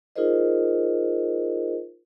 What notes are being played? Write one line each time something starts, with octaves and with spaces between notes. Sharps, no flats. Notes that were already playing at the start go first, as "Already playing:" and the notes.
D#4 F4 G#4 A#4 C5 D#5